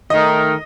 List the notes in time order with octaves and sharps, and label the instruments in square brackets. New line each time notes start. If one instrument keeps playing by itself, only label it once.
[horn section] D#3 A3 D#4 A#4 [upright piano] D#5